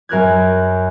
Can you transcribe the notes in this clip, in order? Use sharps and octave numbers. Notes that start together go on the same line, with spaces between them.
F#2 A#4 F#6 G#6